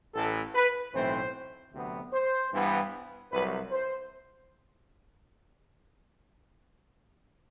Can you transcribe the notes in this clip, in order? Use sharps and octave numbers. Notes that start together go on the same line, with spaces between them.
A1 A2 E3 A4
B4
B1 A2 E3 A3 C4 C5
D2 C3 F#3 B3
C5
G2 E3 B3
C2 C3 F#3 B4
C5